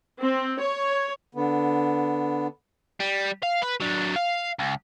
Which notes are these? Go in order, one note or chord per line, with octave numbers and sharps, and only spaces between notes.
C4
C#5
D3 B3
G3
F5
B4
F#3 D4
F5
C#2